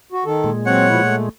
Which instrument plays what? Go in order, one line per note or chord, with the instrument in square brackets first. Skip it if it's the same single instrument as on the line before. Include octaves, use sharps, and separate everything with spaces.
[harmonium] F#4
D#3 A4
[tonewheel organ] A#2 G#3
[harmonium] F#3 C4 [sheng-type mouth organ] C#5 F#5
[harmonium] B2 F3 E4
A3